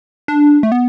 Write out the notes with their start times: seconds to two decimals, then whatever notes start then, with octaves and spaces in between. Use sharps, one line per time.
0.28 D4
0.63 A3
0.72 B3